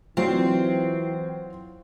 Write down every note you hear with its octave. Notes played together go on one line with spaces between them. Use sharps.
E3 F#3 C4 F4